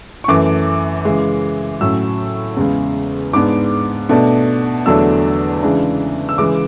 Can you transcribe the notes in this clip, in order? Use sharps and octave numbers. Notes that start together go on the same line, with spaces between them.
C#6
F#2 E3 A3 D6
C#3 E3 G#3
A2 F#3 C#4 E6
E2 C#3 G#3
G#2 G#3 B3 D4 D6
B2 A3 D4
E2 D3 F#3 A3 D4 E6
C#3 E3 G#3 D4
E6
C#3 E3 G#3 D6